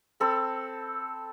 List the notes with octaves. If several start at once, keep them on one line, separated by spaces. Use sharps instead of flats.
C4 A4 B5